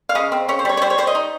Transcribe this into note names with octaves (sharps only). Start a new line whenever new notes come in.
F5
C#3 D#5
C4
C#3 C#5
C5
G3 C#5
C#5
G3 C5
C#5
G3 C5
D#5
D#4